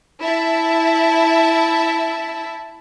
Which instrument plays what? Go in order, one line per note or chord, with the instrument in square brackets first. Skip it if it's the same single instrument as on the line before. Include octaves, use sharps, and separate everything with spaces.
[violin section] E4 E5 A5